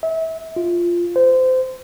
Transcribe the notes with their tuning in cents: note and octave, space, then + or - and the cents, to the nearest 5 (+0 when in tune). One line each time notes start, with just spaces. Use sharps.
E5 -30
F4 -5
C5 -25